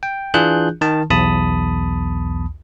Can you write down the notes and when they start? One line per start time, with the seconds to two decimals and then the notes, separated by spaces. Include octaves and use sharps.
0.03 G5
0.34 E3 D4 F4 G#4 F#6 G6
0.81 D#3 A5
1.10 B1 E2 A5 B5 D#6